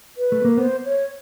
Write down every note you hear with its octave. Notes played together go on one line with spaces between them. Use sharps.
B4
A3
A#3
B3 C5
C#5